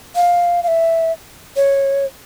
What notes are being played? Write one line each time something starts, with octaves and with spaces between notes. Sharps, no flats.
F5
F5
E5
C#5